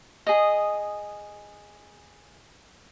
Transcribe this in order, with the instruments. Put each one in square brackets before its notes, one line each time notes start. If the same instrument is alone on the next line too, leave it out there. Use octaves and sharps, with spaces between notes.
[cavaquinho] G#4 D#5